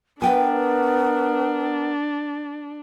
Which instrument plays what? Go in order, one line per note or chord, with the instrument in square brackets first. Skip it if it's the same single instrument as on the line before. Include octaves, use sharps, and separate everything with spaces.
[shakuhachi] B3 [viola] D4 [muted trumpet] A#4 [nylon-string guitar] B4 G5 G#5